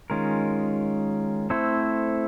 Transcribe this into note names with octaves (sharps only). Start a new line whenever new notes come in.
D#3 G#3 C#4 F4 A#4
A3 C4 E4 A4 C5